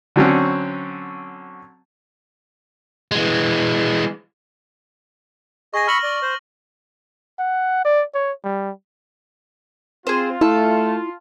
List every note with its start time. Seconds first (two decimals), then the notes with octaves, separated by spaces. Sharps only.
0.16 D3 F#3 C4 C#4
3.11 E3 G#3
5.74 G#4 D#5 C#6 A#6
5.88 B5 C#6 E6 F6 A#6 F#7
6.03 D5
6.22 C5
7.39 F#5
7.85 D5
8.15 C#5
8.44 G3
10.07 C4 F4 G#4 C5
10.41 A3 E4 A4